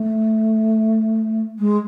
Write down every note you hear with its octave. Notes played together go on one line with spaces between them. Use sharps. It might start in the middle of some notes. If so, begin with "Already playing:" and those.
Already playing: A3
G#3